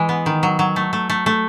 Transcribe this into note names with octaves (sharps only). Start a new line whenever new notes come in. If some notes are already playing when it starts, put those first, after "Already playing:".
Already playing: E3 G#3
B3
D#3
F#3
F#3
A3
A3
A3
A3